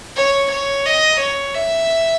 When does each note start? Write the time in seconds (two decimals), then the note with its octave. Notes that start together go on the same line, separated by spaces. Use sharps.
0.16 C#5
0.52 C#5
0.86 D#5
1.20 C#5
1.55 E5